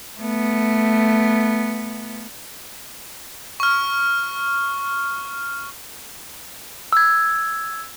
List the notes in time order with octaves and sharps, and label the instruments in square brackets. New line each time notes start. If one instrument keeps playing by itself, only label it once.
[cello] A3 B3
[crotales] C#6 F6
[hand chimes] E6 G#6